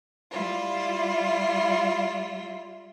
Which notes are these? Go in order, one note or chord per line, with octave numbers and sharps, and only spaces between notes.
G3 E4 F4